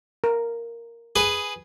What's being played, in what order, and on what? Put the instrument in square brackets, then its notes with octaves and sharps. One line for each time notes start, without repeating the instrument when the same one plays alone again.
[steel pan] A#4
[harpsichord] G#4 B4